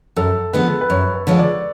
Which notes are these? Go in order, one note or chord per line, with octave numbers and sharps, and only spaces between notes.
F#2 A4
D3 F3 G#3 B3 B4
B4
F#2 C#5
B4
D3 F3 G#3 B3 C#5
D5